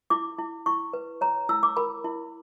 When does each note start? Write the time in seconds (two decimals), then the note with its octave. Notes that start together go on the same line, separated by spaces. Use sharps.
0.10 E4 D6
0.39 E4
0.66 E4 C#6
0.93 B4
1.21 C#5 A#5
1.49 E4 E6
1.63 D6
1.77 A#4 B5
2.04 E4